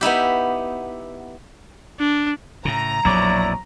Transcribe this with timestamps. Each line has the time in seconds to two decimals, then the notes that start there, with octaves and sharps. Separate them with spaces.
0.01 B3 D#4 E4 G4
1.99 D4
2.65 A2 C#3 A#5
3.05 A#1 F2 B2 F#3 E4 D5